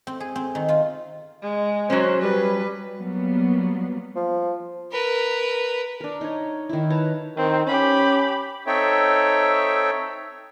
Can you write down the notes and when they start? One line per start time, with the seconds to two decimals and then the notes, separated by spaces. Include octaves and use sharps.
0.07 C4
0.20 G#4
0.35 C4
0.55 D#3
0.68 F4
1.42 G#3
1.90 F#3 C#4 C5
2.21 G3 B4
2.98 F#3 G3 A#3 B3
4.15 F3
4.92 A#4 B4
6.01 D4 A#4
6.21 D#4 C#5
6.69 D#3 E4
6.90 B4 C#5 A5 A#5
7.37 D#3 C4
7.67 C#4 G4 B5
8.67 C4 D#4 A4 C#5 E5 G5